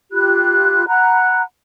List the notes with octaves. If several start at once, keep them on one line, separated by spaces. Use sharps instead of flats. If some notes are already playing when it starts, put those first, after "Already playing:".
F4 G4 B5 F#6
F#5 A#5 B5 F#6